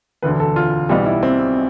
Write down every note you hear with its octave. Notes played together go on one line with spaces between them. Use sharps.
E1 D2 D3 B4
A4
F4
B1 B2 G3 F4
E4
C4